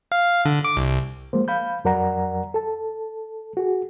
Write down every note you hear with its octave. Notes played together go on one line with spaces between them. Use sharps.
F5
D3
D6
C2
F3 G#3 A#3 C5
F5 B5 G6
F2 F#3 A#4 D5 F#5 A#5
A4 A5
F#4 G#4